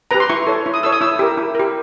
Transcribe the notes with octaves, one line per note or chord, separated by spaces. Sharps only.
G4 B4 A#5
C6
E4 C#6
A4 C#5
E4
D#6
A4 C#5 E6
D#6
E4 E6
G4 A#4
E4
G4 A#4